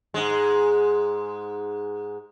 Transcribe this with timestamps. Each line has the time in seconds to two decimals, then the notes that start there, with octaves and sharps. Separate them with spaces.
0.14 G#2 G#3